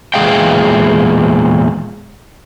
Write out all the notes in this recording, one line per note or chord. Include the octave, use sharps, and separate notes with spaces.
E2 A#2 G#3 G#4 F5 G5